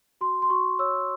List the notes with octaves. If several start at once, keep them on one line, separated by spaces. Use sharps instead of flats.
F#4 C6
C6
F#4 C#6
C#5 E6